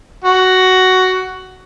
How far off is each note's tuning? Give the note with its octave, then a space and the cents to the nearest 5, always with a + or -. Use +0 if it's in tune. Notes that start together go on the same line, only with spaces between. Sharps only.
F#4 +10